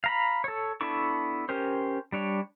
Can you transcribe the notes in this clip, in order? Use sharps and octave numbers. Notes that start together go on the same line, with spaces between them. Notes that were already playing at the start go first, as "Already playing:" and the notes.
F5 A#5 B5
A4 C#5
B3 D4 E4 A4 C#6
C#4 G4 A#4 C5
G3 D4 C#5